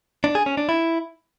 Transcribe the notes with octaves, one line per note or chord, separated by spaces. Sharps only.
D4
G#4
C#4
D4
E4